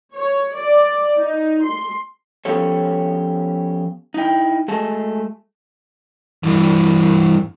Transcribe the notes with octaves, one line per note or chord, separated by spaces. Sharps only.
C#5
D5
D#4
C6
F3 B3 C#4 G4 A4 C#5
D#4 E4 G5
G#3 A3 F#4 G#4 D#5 A5
G2 E3